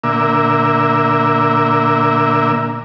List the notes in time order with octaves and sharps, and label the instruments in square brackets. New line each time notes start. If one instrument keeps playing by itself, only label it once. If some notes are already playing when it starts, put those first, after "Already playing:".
[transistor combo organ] A#2 D3 A#3 E5